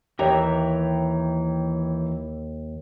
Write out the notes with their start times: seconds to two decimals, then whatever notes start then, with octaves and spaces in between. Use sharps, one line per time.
0.19 D#2 E3 G4 C#5 E5 G5 A#5